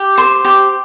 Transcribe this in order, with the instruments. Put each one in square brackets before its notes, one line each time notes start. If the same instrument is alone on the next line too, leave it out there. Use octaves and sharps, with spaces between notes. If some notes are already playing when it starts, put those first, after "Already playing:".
Already playing: [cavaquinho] G4
C5 C6
G4